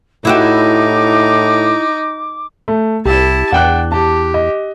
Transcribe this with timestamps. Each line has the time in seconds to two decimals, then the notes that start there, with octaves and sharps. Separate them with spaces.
0.25 A2 D#4 E4 F#4 G4 D6
2.68 A3
3.06 C2 E4 G4 A5
3.52 E2 D4 F#5 G5 F#6
3.92 G4 A5
4.34 D#5